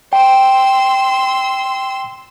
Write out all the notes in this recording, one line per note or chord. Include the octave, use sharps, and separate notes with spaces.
G5 C6 E6